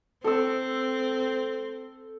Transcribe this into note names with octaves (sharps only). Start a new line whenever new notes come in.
C4 A4 E6